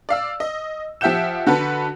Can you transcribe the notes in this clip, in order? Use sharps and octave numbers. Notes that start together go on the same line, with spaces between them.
D5 F5 E6
D#5
F3 G4 E5 F#5 G6 E7
D3 F#4 A4 B4